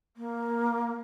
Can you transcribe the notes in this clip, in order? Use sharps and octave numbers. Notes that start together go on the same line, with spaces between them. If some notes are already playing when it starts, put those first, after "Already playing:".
A#3